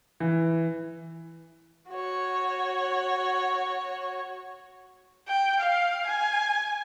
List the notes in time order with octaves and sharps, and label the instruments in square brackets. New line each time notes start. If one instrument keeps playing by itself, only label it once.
[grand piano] E3
[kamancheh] F#4 C#5
[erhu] G5
F5
G#5